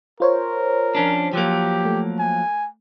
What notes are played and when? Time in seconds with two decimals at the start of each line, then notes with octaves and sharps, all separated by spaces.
0.20 F4 A#4 C5 C#5
0.95 F3 C#4 D4
1.33 F3 F#3 A#3 G4
1.85 A3
2.19 G#5